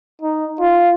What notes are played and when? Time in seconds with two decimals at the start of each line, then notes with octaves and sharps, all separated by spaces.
0.22 D#4
0.60 F4